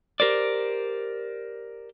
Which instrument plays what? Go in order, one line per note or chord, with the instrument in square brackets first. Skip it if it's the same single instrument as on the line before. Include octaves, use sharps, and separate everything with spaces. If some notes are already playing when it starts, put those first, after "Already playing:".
[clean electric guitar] G4 A#4 C5 D5